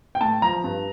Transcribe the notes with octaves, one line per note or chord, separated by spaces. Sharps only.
G5
A2 A5
F3 A#5
G2